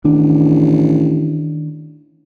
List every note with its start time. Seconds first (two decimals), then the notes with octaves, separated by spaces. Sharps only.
0.05 A1 D#3 D4